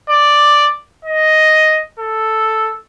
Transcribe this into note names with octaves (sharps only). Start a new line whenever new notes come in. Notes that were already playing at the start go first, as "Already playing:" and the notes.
D5
D#5
A4